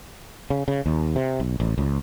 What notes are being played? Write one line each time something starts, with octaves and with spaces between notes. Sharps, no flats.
C#3
C#3
D#2
C3
B1
A1
C#2